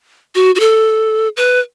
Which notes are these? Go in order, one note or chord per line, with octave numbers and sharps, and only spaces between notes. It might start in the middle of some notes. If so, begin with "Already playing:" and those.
F#4
F#4
A4
B4